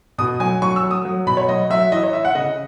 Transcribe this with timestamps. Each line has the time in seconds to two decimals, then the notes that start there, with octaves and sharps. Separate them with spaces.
0.18 B2 D#6
0.40 F#3 G#5
0.62 F#3 C#6
0.76 E6
0.83 F#3
0.91 D#6
1.05 F#3
1.26 B2 B5
1.37 C#5
1.48 F#3 D#5
1.70 F#3 E5
1.92 E3 D#5
2.03 C#5
2.13 E3 E5
2.25 F#5
2.35 C#3 D#5